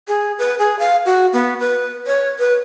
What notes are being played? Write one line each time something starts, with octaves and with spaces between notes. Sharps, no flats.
G#4
B4
G#4
F5
F#4
B3
B4
C#5
B4